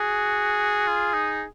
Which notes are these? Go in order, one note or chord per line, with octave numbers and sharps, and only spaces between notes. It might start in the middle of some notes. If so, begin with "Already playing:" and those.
Already playing: F#4 G#4
F4
D#4